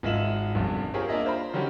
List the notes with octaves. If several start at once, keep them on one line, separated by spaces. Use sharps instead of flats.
G#1 G#3 F4 E5 E7 F#7
G1 C2 F2
F4 G4 G#4 A#4 C5 C#5
A#3 D4 F4 D#5 E5
F4 C5 A#5 B5
D3 D#3 F#3 C#4 G4